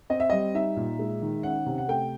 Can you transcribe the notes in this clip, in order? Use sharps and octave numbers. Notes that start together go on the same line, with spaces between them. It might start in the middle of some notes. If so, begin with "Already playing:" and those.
C4 D#5
E5
G3 D#5
D#4 E5
A#2
G#3
D#3
C#4 F#5
C3
F#5
A3 G5